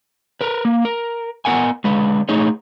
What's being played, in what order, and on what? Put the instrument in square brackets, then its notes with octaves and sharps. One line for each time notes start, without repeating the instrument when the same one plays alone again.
[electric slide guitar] A#4 B4
A#3
A#4
B3 A#4 F#5 G#5
D3 G#3 B4
A3 D#4 G#4 C#5